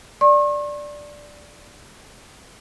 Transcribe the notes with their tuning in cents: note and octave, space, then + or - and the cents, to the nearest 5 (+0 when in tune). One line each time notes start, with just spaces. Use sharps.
D5 +0 C#6 -45